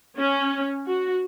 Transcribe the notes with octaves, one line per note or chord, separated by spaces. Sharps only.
C#4
F#4